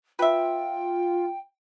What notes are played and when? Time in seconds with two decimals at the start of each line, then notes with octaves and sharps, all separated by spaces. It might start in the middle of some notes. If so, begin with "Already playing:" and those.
0.19 F4 B4 E5 G5